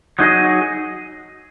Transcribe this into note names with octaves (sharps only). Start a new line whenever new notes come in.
F#3 D#4 G#4 D#5